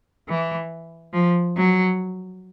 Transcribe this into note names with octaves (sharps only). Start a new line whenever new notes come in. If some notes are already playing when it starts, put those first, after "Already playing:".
E3
F3
F#3